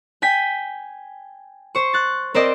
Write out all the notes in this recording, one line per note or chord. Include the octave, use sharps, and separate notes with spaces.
G5 G#5 B6
C5 C#6
F#6 A6
C4 A#4 C5 D5 D#5